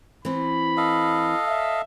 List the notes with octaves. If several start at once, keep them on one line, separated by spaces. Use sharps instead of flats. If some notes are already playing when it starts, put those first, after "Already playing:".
E3 C4 B5
A4 D#5 F5
E5